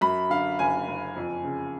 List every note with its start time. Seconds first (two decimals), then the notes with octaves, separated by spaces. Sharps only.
0.01 F#2 B5
0.30 D3 F5
0.59 F#1 G#5
0.88 F#1
1.16 F2
1.44 C#3